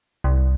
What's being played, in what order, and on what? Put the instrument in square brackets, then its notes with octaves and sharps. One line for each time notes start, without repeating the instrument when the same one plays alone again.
[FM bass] C2